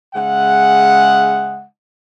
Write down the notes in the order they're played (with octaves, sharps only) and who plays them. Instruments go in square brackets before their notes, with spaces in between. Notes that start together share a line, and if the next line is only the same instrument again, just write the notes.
[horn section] C#3 G#3 E5 F#5